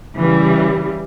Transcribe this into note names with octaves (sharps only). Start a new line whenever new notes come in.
C#3 E3 G3